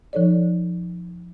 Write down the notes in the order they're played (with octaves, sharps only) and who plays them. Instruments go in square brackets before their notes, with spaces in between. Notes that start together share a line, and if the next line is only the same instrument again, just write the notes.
[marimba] F3 D#4 A4 C#5 D5